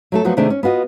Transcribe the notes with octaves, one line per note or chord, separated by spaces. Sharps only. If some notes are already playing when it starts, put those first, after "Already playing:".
F#3 A3 A4
F3 F#3 A3 B3 F#4
C3 D#3 A3 D4 G#4
C#4
B3 F4 F#4 D#5